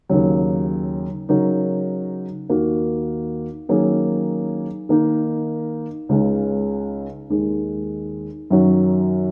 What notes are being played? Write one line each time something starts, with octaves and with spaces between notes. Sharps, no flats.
D#2 C#3 F#3
C#3 F#3 D#4 F#4 A#4
D#2 D#3 A#3 F#4 A#4
D#3 F#3 A#3 C#4 G#4
D#3 A#3 D#4
C#2 C#3 G#3 D#4
D#2 D#3 G#3
F#2 D#3 F#3 C#4 F#4